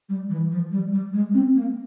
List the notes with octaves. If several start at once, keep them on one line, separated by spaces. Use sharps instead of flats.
G3
E3
F3
G3
G3
G#3
C4
A#3